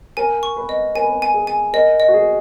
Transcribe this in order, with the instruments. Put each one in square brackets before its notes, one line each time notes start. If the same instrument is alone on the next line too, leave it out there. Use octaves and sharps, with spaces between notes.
[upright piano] A#4 [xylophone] G#5
[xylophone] C#6
[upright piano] B4
[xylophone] D#5
[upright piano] A#4 [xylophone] G#5
[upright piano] B4
A#4
[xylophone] G#5
[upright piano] G#4
[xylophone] G#5
[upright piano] A#4 [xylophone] D#5
[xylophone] D#5
[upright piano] F#4
G#4